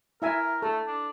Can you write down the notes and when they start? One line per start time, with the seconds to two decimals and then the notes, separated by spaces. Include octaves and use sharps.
0.22 E4 A#4 E5 G#5
0.62 A3 A4
0.87 D4